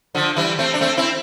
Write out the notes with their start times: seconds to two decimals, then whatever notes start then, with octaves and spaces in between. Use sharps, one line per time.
0.15 D3 F3
0.36 E3 G3
0.59 A3 C4
0.74 D4
0.81 A3 C4
0.97 C4 E4